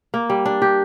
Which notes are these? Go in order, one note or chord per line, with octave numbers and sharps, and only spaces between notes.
A#3
G3
D4
G4